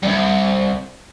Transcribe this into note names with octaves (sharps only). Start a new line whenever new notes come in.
C2 G2